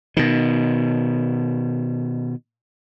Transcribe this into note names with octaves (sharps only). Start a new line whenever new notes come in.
B2 D#3